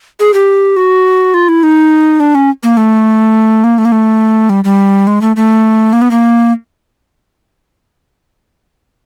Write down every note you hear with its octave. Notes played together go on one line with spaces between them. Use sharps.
G#4
G4
F#4
F4
E4
D#4
D4
C#4
A#3
A3
A#3
A3
A#3
A3
G3
G3
G#3
A3
A3
A#3
B3
A#3